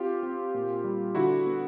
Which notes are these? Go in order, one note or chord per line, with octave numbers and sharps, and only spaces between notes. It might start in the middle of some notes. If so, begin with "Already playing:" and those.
Already playing: C4 F4 G4
C4
A#2
G3
D3 E4 F#4
B3